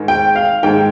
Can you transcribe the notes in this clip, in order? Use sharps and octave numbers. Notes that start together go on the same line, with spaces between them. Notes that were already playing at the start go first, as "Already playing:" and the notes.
Already playing: G#2 D#3
G5
F5
G#2 D#3 G5